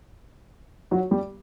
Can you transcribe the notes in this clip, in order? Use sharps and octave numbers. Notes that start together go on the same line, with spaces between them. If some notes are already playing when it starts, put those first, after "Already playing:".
F#3 F#4
G3 G4